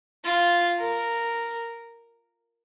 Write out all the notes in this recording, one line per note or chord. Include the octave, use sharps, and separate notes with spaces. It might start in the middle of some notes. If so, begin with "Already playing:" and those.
F4
A#4